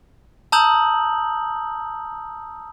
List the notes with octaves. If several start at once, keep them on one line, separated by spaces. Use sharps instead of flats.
A5 A#5 D#6 E6 G6 F#7